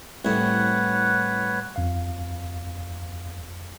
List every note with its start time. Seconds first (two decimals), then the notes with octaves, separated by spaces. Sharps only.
0.25 C2 A2 B4 C#5 F#5
1.76 F2 F5